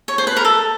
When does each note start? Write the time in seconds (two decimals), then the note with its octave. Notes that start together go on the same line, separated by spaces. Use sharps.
0.08 C#5
0.18 C5
0.27 B4
0.37 A#4
0.45 A4